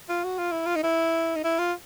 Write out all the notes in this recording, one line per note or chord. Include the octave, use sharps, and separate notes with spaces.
F4
F#4
F4
E4
F4
D#4
E4
D#4
E4
F4